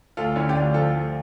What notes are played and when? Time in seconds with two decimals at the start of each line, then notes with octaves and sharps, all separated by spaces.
0.17 D2 F4 A4
0.36 D3 C#4 E4
0.49 G4
0.55 D2 D4 F4
0.74 F3 F4 A4
0.93 D2